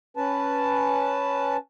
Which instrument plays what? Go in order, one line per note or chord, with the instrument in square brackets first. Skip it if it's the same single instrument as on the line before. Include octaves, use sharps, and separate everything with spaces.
[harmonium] C#4 B4 A5